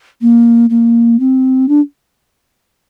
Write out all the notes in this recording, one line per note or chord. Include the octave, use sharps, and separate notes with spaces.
A#3
A#3
C4
D4